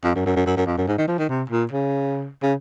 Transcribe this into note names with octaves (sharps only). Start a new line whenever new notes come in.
F2
F#2
F#2
F#2
F#2
F#2
F2
F#2
G#2
D#3
F3
D#3
C3
A#2
C#3
C#3